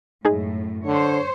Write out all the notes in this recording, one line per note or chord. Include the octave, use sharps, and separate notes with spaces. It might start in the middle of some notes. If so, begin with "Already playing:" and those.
F#2 A2 G#3 D#4 G#4
D3 C5 C#5